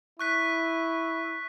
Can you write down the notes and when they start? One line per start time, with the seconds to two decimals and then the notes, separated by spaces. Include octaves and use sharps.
0.19 E4 C#6 F#6 B6